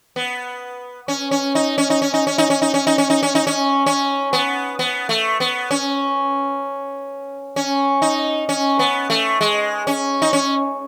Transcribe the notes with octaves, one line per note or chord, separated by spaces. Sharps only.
B3
C#4
C#4
D#4
C#4
D#4
C#4
D#4
C#4
D#4
C#4
D#4
C#4
D#4
C#4
D#4
C#4
D#4
C#4
C#4
B3
B3
A3
B3
C#4
C#4
D#4
C#4
B3
A3
G#3
C#4
D#4
C#4